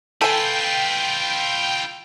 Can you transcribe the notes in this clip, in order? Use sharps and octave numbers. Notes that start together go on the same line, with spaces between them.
F4 A4 B4 G5 G#5